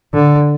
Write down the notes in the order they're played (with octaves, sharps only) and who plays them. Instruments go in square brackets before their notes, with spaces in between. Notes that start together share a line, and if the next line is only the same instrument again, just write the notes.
[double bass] D3